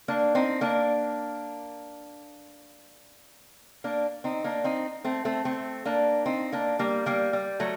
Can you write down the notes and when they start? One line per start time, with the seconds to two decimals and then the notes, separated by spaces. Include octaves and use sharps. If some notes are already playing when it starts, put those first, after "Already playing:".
0.08 A#3 D4
0.35 C4 D#4
0.61 A#3 D4
3.84 A#3 D4
4.24 C4 D#4
4.44 A#3 D4
4.64 C4 D#4
5.04 A3 C4
5.25 A3 C4
5.45 A3 C4
5.85 A#3 D4
6.26 C4 D#4
6.52 A#3 D4
6.79 G3 A#3
7.06 G3 A#3
7.33 G3
7.60 F#3 A3